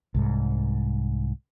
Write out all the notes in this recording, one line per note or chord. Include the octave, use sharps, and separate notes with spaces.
C2 G#2